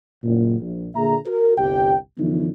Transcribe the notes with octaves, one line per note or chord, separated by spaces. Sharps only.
F#1 A#2
A#1
A#2 D3 A#3 G#4 E5 A#5
F#4 A#4
G1 C2 G4 G5
F#2 D3 E3 F3 B3 D#4